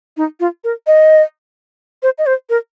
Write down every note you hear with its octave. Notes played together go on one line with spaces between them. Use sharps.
D#4
F4
A#4
D#5
C5
D#5
C5
A#4